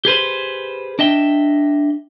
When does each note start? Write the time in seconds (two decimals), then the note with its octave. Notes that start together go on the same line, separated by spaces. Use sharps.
0.05 G4 G#4 B4 C5
0.99 D4 D#5 E5 G5